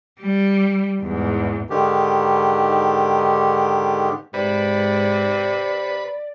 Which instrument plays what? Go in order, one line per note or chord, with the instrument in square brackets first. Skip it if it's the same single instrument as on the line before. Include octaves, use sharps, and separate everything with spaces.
[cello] G3
E2 G#2
[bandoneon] G#2 D3 D#3 G4
[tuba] G#2 [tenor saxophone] C3 [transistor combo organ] B4 [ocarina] D5